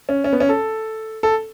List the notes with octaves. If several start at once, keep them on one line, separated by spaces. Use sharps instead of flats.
C#4
C#4
B3
C#4
A4
A4